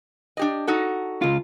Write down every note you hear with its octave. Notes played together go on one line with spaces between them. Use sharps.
D4 G4 D#5
D#4 F#4 A4
C#2 F4